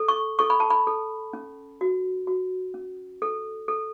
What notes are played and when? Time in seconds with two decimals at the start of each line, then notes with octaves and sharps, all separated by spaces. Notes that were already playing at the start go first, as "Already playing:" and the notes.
Already playing: A4
0.08 C#6
0.39 A4 C#6
0.50 B5
0.60 A5
0.70 B5
0.87 A4
1.33 C#4
1.81 F#4
2.27 F#4
2.74 C#4
3.22 A4
3.68 A4